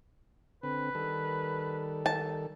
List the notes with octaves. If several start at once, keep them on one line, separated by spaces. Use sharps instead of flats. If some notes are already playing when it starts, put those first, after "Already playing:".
D3 C4 B4
D#3 G3 A4
A5